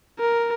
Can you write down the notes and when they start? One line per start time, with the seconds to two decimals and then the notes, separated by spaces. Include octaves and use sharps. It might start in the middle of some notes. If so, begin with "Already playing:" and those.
0.19 A#4